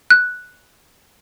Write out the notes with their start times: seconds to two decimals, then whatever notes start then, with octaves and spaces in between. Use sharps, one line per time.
0.10 F#6